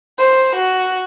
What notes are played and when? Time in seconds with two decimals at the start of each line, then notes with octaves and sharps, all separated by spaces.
0.18 C5
0.56 F#4